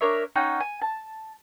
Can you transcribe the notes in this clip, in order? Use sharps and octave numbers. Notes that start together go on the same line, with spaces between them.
D4 A#4 C#5 E5
C#4 D#4 F#5 G5
G#5
A5